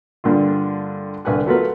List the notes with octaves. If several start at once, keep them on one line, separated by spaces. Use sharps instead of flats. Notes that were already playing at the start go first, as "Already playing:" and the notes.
G2 D3 A#3 F4
C2 D3 B4 F#5 G#5 F#6
F#3 A3 B3 F4 A#4 B4